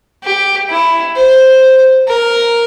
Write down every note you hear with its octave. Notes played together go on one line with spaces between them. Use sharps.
G4
E4
C5
A#4